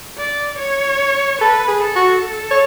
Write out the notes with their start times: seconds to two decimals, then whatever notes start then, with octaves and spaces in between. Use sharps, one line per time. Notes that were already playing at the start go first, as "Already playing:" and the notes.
0.18 D5
0.59 C#5
1.41 A4 B4
1.68 G#4
1.83 A4
1.96 F#4
2.51 C#5